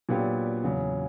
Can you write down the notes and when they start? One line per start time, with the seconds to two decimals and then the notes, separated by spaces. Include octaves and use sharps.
0.09 A#2 F#3 B3 D4 G4
0.64 E2 C#3 F#3